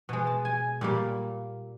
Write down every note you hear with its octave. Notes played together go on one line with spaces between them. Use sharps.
B2 G#3
A5
G#5
A#2 G3 A#3